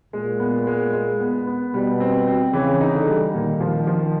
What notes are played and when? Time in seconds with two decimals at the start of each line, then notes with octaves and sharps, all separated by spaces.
0.13 A#2 G#3
0.40 B3
0.67 G#3
0.93 G#3
1.20 B3
1.47 B3
1.74 B2 G3
2.00 C4
2.27 C4
2.53 C#3 E3
2.81 D#4
2.94 D3
3.07 G3
3.34 A#2 D#3
3.60 F3
3.87 F3